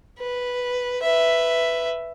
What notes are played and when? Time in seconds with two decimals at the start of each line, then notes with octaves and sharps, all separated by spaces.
0.20 B4
1.02 B4 E5